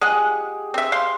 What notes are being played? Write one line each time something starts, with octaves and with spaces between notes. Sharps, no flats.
G#3 G4 G#4 D#5 F#5
C4 E5
C5 F5 C6